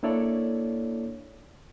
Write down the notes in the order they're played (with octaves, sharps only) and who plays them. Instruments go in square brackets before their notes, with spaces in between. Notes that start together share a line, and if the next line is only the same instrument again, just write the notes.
[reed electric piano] A#3 D4 E4 A4 C#5 D5